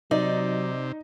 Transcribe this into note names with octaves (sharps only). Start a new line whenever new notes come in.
C3 F#3 D#4 D5